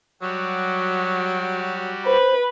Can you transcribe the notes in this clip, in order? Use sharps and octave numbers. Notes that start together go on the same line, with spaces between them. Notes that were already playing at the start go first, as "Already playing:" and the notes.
F#3 G3 F#4 G4
B4 C5